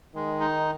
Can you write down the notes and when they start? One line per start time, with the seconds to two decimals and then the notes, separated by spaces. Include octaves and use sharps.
0.15 D#3 G#3
0.40 D#4